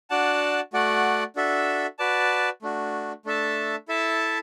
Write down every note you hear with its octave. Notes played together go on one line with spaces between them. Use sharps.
D4 F#4 D5 F#5 A5
A3 F#4 D5 F#5
D4 F#4 A4 E5
F#4 B4 D5 A5
A3 D4 F#4
A3 D4 A4 E5 A5
E4 A4 E5 A5